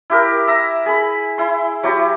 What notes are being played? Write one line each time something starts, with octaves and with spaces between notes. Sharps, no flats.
E4 G4 A#4
E5 A#5
G#4 B5
E4 C6
F#3 E4 G4